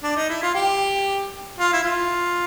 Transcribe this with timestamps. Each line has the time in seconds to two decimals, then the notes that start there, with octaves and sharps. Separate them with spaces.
0.03 D4
0.16 D#4
0.29 E4
0.43 F4
0.55 G4
1.59 F4
1.73 E4
1.84 F4